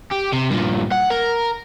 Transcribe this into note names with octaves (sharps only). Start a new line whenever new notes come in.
G4
C3
G2 A#2
F#5
A#4